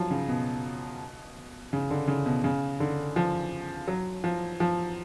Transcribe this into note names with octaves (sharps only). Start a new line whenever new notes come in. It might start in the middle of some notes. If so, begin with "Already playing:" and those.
Already playing: F3 F#3
C#3
B2
C#3
D3
C#3
B2
C#3
D3
F3
F#3
F3
F3